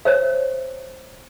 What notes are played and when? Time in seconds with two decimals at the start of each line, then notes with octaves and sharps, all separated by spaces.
0.05 C5 C#5 E5